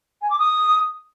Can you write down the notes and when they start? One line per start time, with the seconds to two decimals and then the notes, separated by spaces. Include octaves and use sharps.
0.21 G#5
0.30 D6
0.38 D#6